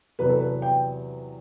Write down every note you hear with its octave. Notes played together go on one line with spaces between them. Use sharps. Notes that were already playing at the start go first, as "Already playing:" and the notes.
E2 C3 F#3 B3 B4
A4
B4
G5